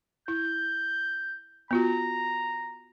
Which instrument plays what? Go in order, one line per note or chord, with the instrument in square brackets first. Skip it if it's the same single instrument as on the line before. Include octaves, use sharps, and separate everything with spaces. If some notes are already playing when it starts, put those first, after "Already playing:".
[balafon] E4 [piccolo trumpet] G6
[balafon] B3 F4 F#4 [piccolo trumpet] A#5